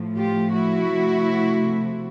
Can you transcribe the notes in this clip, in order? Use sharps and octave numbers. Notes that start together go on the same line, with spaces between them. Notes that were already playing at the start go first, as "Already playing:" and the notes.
Already playing: A2 F3 A3
F4 G4
E4 F#4
C3 F3 A3